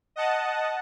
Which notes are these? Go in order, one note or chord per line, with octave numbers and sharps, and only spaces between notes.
D#5 F#5 A5